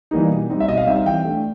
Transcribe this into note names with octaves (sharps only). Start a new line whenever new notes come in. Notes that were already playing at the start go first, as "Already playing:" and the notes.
E3 G3 A#3 D#4
B2
G3 C4 D#4
E5
B2 D#5
F5
G3 C4 D#4 E5
F5
E3 G5
A3 D4